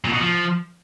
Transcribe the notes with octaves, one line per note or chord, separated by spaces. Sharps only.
A#2
B2
F3